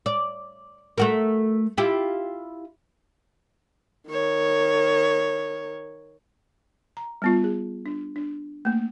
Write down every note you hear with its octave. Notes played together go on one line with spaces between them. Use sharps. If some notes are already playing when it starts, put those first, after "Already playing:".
D5
A3 F#4 A#4
E4 F4 G4
D#3 C#5
A#5
G3 B3 F4
G#4
D4
D4
A3 A#3